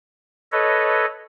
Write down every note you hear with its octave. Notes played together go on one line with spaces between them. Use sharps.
A4 B4 C#5 D#5